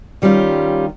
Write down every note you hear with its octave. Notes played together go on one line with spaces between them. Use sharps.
D#3 G3 C#4 F4